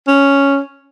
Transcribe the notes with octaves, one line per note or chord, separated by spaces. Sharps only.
C#4